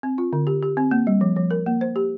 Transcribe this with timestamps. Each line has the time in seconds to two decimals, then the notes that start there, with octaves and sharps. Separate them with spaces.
0.03 C4
0.18 F4
0.33 D3
0.47 G4
0.63 G4
0.77 C4
0.91 A#3
1.07 G3
1.21 F3
1.36 F3
1.51 A#4
1.66 A#3
1.81 C5
1.96 G4